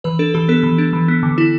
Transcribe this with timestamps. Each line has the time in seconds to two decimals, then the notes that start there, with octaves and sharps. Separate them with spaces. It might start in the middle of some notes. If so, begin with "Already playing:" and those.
0.04 E3 B4
0.19 D4 A4
0.34 E3 G4
0.49 B3 A4
0.63 E3
0.78 D4
0.93 E3
1.08 B3
1.23 D3
1.38 E4